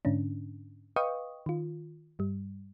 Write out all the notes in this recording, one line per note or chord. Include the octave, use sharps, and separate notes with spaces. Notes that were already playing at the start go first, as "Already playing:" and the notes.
G#2 D3 C#4 D4
B4 D#5 F5 G5 C#6 D#6
D#3 F4
G2 G3